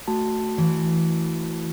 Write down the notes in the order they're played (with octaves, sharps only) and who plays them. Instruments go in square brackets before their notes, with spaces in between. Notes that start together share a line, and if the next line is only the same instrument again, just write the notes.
[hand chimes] A3 F#4 A5
[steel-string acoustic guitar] E3